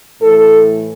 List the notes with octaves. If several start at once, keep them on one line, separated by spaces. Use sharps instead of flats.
A2 E3 A4